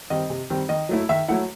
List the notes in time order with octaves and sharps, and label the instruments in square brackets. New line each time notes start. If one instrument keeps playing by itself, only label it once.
[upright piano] D#3 G3 C4 D#5
C3
D#3 G3 C4
D#3 D#5
F#3 A3 E4
D#3 E5
F#3 A3 E4 F#5